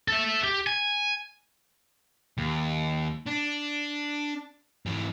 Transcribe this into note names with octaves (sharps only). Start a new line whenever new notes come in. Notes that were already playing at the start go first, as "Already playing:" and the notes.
A4 E5
G4
G#5
D#2
D4
G#2 E3